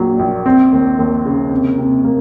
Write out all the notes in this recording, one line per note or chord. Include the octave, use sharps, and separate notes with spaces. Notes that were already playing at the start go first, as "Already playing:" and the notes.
Already playing: A#1 A#2 F#3
A#1
C4
D#2
D#2
C#3
C3
C3
A#3